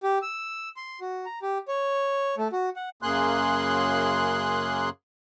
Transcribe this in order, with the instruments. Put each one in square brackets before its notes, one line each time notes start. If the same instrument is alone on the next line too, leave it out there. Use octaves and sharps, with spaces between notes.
[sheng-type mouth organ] G4
E6
C6
F#4
A#5
G4
C#5
A3
F#4
F#5
[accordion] F#2 C#3 A#3 G#4 C6 F#6